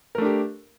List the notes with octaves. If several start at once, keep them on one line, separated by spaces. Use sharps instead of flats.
A3 D4 G4 A#4